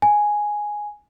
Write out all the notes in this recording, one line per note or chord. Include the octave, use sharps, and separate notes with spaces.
G#5